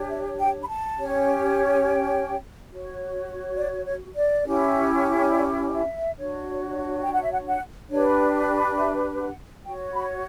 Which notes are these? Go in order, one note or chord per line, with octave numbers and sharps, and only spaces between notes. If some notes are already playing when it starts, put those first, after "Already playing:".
Already playing: D4 G4 C#5
E5
G5
B5
A5
C#4 G4 C#5
G5
F#4 C#5
D5
C#5
D5
C#4 E4 G4
D5
D5
E5
D4 F#4 C#5
G5
F#5
E5
F#5
F#5
D4 G4 B4 C#5
D5
E5
F#5
F#4 C#5 G5
B5